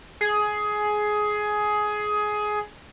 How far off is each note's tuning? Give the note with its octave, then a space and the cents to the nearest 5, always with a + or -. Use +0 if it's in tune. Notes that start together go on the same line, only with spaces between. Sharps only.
G#4 +15